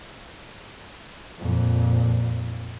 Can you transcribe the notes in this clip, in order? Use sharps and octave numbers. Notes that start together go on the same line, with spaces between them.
F2 A#2